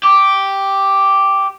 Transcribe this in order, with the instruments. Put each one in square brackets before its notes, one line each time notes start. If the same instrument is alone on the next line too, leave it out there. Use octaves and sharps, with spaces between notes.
[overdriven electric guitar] G4